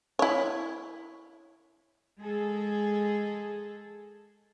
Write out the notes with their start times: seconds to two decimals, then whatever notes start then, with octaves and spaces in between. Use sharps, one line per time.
0.19 E4 C#5
2.21 G#3 G#4 A4